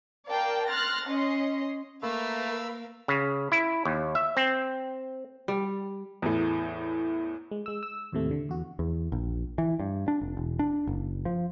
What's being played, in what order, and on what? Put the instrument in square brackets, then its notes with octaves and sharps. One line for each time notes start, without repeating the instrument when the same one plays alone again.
[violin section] A#4 D5 F5 G5 A5
C6 F6 F#6 A6 A#6
C#4 C#5 D#5 C6
[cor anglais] A3 [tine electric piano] A#3 [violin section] A#4 B4 F5 [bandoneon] B5 E6
[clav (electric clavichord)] C#3
E4
D#2
E5
C4
[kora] G3
[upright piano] E2 A2
[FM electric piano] G#3
G#3 E6
E6
D#2 A2 C3 A3
D3
E2 F#4
[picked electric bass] E2
A#1
E3
G2
D4
F1
E1
D4
F#1
F3